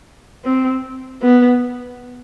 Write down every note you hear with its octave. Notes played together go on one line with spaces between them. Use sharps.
C4
B3